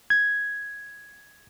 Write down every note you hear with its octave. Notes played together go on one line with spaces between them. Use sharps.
G#6